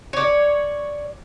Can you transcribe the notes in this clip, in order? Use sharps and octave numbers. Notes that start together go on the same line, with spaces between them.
C#5 D5